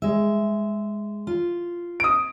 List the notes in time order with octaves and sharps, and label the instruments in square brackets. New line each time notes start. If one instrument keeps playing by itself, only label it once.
[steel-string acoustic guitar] G#3 E5
F4
[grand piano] D#6 D7